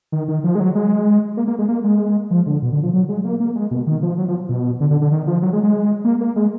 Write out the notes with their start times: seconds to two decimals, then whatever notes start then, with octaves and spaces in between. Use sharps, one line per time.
0.12 D#3
0.28 D#3
0.44 F3
0.55 G#3
0.60 F#3
0.75 G#3
1.37 A#3
1.48 A#3
1.58 G#3
1.68 A#3
1.84 G#3
2.31 F3
2.46 D3
2.62 B2
2.72 D3
2.83 F3
2.93 F#3
3.09 G#3
3.24 A#3
3.40 A#3
3.55 G#3
3.71 B2
3.87 D#3
4.03 F3
4.18 F#3
4.28 F3
4.49 B2
4.80 D3
4.91 D3
5.01 D3
5.12 D#3
5.27 F3
5.42 F#3
5.53 G#3
5.63 G#3
6.04 A#3
6.21 A#3
6.36 G#3